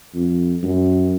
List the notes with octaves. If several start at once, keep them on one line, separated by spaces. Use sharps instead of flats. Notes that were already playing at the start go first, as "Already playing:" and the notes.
F2
F#2